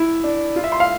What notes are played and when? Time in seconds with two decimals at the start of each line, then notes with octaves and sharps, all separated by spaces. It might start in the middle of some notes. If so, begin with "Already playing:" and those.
Already playing: E4
0.24 D4
0.56 F4
0.64 E5
0.72 C6
0.80 F5